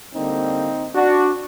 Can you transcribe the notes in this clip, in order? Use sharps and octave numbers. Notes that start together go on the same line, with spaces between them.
D3 G3 A#3 C4 D#4
D4 F#4